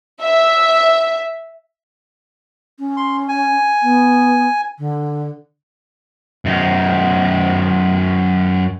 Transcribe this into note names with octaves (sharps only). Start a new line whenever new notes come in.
E5
C#4
C6
G#5
B3
D3
F#2 D#4